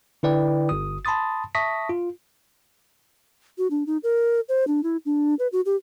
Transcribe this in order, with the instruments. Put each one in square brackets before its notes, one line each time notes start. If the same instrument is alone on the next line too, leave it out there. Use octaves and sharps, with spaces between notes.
[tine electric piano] D3 E4 B4 D5 G5
G1 D#6
A5 B5 C6 D#6 A6
E5 A5 C#6 D#6 A#6 B6
F4
[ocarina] F#4
D4
D#4
A#4
C5
D4
E4
D4
B4
F#4
G4